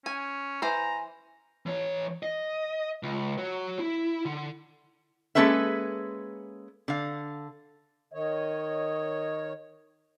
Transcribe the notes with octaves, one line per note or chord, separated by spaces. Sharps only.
C#4 G#5
E3 C5 G#5 A#5
E3 C#5
D#5
C#2
F#4 C#5
E4
D3
G#3 A#3 C#4 A4 B4 E5
D3 F5
D#3 C#5 D#5